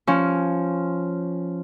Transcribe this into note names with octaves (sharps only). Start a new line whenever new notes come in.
F3 C#4